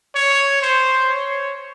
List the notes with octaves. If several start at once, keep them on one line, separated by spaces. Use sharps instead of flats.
C#5
C5
C#5